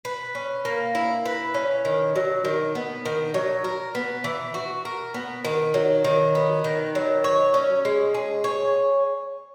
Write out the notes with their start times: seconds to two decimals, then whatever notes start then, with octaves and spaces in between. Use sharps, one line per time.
0.05 B4
0.35 C#4
0.65 A#3
0.95 E4
1.26 B4
1.54 C#4
1.85 D#3
2.15 F#3
2.45 D#3
2.75 B3
3.05 D#3
3.34 F#3
3.64 A#4
3.95 B3
4.24 E3
4.54 F#4
4.85 A#4
5.14 B3
5.45 D#3
5.74 F#3
6.04 D#3
6.35 B3
6.64 D#3
6.95 F#3
7.24 C#5
7.54 C#4
7.85 G#3
8.14 G#4
8.44 C#5